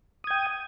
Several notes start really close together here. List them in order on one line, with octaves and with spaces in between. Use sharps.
D#6 G#6 G5